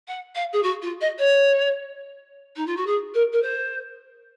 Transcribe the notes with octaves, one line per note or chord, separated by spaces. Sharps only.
F#5
F5
G#4
F#4
F4
D#5
C#5
D#4
F4
F#4
G#4
A#4
A#4
C5